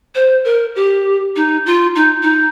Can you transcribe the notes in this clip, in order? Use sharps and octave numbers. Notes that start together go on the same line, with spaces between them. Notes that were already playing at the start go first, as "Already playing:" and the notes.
C5
A#4
G4
D#4
F4
D#4
D#4